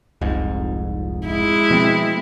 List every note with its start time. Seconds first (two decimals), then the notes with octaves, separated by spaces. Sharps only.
0.21 F1 C2 F2 G#2
1.27 G#3 E4
1.70 B2 F3 A3 C4